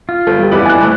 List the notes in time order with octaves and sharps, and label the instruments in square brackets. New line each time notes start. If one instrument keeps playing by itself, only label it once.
[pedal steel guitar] F4
[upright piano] G1 [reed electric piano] A4
[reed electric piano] G3 G4
[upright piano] F1 E2 B4 [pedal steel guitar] E4 D5 D#5
[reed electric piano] G#5 F#6
[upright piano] F#1 A3